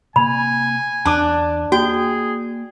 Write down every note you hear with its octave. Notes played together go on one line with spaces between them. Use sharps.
C3 A#3 G#5 B5
E2 D4 A5 D6
A#3 F#4 G#4 G5